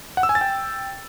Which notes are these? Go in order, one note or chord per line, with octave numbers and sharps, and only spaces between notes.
F#5
E6
G#5
A6
G5